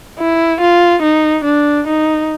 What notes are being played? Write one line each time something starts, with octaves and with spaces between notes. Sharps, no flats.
E4
F4
D#4
D4
D#4